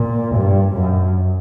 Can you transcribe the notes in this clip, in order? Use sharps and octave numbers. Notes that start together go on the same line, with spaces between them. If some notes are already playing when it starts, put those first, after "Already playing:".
Already playing: A#2
G2
F#2